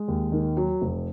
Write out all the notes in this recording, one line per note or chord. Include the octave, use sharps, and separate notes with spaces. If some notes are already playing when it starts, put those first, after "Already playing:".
Already playing: G#3
D#2
D#3
F#3
F1